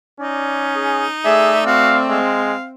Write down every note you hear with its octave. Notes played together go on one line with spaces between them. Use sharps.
C#4 D#4 D5
G#4
A3 G#4 D5 E5 E6
C4 F#4 F5
G#3 F5